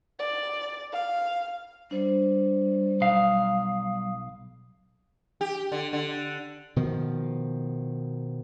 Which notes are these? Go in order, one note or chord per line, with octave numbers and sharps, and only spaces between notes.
D5
F5
G3 D4 C5
B1 F5 D#6
G4
D3
D3
B2 D#3 F3